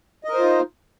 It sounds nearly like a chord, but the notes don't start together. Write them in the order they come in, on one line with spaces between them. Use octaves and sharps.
D#5 A#4 C5 F4 D#4